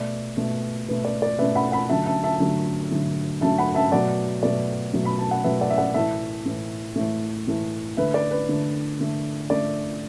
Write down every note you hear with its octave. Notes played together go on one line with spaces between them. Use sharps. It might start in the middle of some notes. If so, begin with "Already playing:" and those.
Already playing: B2 A3 D5
B2 A3
B2 A3 B4
D5
D5
B2 A3 B4 E5
F#5 B5
F#5 B5
D3 F#3 A3 E5 A5
E5 A5
E5 A5
D3 F#3 A3
D3 F#3 A3
D3 F#3 A3 E5 A5
F#5 B5
E5 A5
B2 F#3 A3 D5 F#5
B2 F#3 A3 D5
B2 F#3 A3
B5
A5
F#5
B2 F#3 A3 B4 E5
D5 F#5
E5
D5 F#5
A2 E3 A3 E5 A5
A2 E3 A3
A2 E3 A3
A2 E3 A3
D3 A3 B4 E5
D5
B4
D3 A3
D3 A3
D3 A3 D5